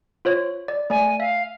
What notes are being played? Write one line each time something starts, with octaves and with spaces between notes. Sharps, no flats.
F4 C5 C#5
D5
A3 D5 G#5
E5 F5